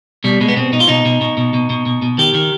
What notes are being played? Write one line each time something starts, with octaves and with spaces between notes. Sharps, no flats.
B2 G3
B2 G#3
B3
B2 C4
B2 D#4
F4
B2 D#4
B2
B2
B2
B2
B2
B2
B2
D#3 G4
D#3